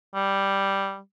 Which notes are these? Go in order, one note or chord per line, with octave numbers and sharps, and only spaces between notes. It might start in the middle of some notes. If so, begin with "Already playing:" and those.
G3